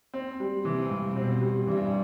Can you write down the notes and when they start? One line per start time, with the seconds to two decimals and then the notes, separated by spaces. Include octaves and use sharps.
0.14 C4
0.40 G3
0.65 C3 E3
0.90 G2
1.16 B2 C4
1.41 G3
1.67 G2 E3